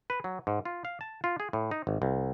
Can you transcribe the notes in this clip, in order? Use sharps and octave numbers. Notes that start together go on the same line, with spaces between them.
B4
F#3
G#2
F4
F5
A5
F4
G#4
A2
D#4
G#1
C2